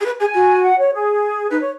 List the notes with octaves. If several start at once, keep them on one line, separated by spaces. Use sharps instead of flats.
G#4
B4
G#4 G#5
F#4
F#5
C#5
G#4
D#4 B4
C#5